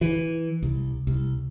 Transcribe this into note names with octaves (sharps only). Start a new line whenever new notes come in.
E3
C2
C2